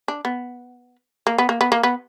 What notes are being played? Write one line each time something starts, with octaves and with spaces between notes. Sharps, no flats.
D4
B3
A#3
B3
A#3
B3
A#3
B3